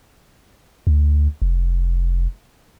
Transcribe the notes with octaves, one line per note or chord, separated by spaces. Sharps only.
D2
F1